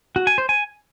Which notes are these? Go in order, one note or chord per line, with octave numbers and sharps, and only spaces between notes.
F#4
G#5
C5
G#5